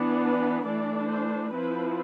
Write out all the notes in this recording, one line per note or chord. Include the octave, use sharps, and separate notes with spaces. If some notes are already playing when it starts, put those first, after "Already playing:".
Already playing: E3 B3 D4
B4
E3 A3 D4 D5
C5
F3 C4 E4 B4